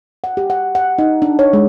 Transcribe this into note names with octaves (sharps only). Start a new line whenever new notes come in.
F#5
G4
F#5
F#5
D#4
D4
C#5
G#3